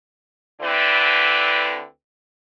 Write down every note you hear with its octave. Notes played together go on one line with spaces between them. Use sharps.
D2 D3 C4 E4 B4 D5